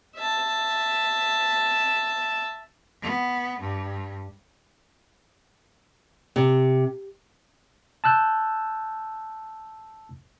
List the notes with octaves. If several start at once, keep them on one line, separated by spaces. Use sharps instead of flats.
E5 A5
B3
G2
C3
A5 E6 F#6 G6